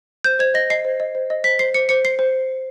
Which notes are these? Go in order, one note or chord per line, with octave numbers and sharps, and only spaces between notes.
C5 G6
C5 G#6
D#5 A#6
D#5 C7
C5
D#5
C5
D#5
C5 B6
C5 C7
C5 C#7
C5 C#7
C5 C7
C5